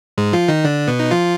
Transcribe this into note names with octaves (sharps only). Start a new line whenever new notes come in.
G#2 G#3
F3 F4
D#3 D#4
D3 D4
B2 B3
D#4
F3 F4